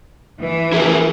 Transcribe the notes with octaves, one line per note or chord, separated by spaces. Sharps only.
E3
E4 G#4 A#4